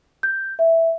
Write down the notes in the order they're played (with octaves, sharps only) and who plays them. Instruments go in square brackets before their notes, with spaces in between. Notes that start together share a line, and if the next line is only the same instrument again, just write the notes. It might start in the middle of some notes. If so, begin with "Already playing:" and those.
[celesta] G6
E5